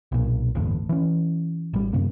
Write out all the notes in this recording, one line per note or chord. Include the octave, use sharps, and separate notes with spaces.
B1 A#2
G1 E2 A2
E3 C#4
A1 G3
F#2 C3 A#3